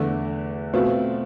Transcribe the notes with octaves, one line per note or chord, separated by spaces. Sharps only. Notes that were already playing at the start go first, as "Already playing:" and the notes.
Already playing: E2 D3 A3
B2 A3 C4 F4 B4